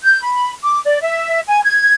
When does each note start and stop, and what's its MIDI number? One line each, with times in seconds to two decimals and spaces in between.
0.04 0.21 91
0.22 0.52 83
0.62 0.80 86
0.85 0.99 74
1.02 1.39 76
1.47 1.61 80
1.64 1.92 92